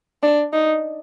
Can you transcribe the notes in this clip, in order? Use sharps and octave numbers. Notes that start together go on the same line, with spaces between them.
D4
D#4